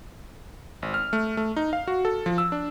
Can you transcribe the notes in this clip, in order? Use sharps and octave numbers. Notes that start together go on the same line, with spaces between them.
G#1
F6
A3
A3
D#4
F5
F#4
A4
F3
E6
D4